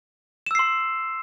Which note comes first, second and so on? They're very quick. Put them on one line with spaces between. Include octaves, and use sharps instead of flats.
E7 E6 C7 C6